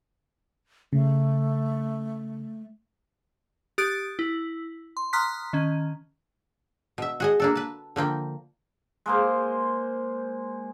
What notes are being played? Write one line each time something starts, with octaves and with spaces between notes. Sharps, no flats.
C#3 A3
G4 D#6 F#6 A6 D7
E4
C6
A#5 C6 D#6 F6 F#6 B6
D#3 C#4
B2 E5
F#4 G#4 D#5
A#3 D4 A4
B4 A5
D3 F3 A#3 G5
G#3 A#3 C5